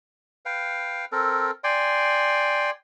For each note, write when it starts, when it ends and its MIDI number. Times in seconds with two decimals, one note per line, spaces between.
0.46 1.05 71
0.46 1.05 77
0.46 1.05 79
1.12 1.51 60
1.12 1.51 69
1.12 1.51 70
1.64 2.70 74
1.64 2.70 79
1.64 2.70 80
1.64 2.70 84